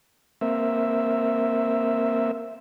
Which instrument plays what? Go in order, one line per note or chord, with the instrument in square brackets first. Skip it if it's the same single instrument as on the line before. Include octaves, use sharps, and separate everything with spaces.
[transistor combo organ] A#3 C4 E5